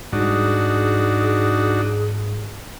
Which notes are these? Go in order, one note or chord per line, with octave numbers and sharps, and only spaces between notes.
G#2 G3 D4 D#4 F#4 G#4